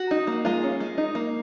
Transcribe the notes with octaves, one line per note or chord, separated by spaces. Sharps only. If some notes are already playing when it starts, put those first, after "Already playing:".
Already playing: F#4
D#4
A#3
G#3 F4
C#4
G#3
D#4
A#3